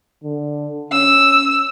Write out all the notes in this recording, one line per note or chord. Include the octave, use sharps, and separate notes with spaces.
D3
C#4 E6